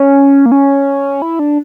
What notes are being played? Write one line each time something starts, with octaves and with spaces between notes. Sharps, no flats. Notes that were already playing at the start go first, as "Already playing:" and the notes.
Already playing: C#4
A#3
C#4
E4
D4